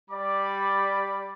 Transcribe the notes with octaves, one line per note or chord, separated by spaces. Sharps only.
G3 D5 B5 D6